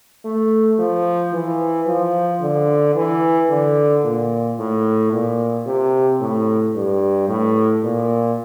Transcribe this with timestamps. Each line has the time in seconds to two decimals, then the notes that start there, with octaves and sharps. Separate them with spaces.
0.25 A3
0.79 F3
1.33 E3
1.87 F3
2.42 D3
2.95 E3
3.50 D3
4.04 A#2
4.59 A2
5.12 A#2
5.66 C3
6.21 A2
6.75 G2
7.29 A2
7.84 A#2